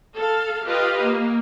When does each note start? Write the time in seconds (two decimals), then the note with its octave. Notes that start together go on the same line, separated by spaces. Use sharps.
0.16 A4 F5
0.67 F4 G4 B4 D#5 F5
1.01 A#3